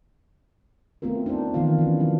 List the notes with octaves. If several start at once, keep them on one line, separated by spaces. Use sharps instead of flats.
A3 B3 C4 F4 A#4
D4 D#4 A#4 C5
D#3 E3 B3 F4 F5
E3 C#4
F3 F#3 D4